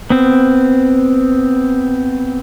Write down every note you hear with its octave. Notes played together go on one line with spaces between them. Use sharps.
B3 C4